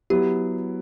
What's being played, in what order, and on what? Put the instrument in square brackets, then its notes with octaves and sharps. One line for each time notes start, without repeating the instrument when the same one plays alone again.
[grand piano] F#3 B3 E4 [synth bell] G4